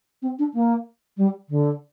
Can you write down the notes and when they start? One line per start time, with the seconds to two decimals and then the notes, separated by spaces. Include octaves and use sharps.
0.22 C4
0.39 D4
0.54 A#3
1.17 G3
1.49 D3